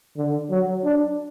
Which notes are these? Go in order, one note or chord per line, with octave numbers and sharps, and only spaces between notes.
D3
F#3
D4